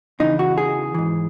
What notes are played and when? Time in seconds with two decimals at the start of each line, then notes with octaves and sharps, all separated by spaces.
0.20 E2 C#3 E3 D#4
0.39 F#4
0.58 G#4
0.94 G#2 E3